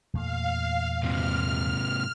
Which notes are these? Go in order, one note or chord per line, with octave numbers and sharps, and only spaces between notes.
E2 A#2 A3 F5
G#2 C3 F6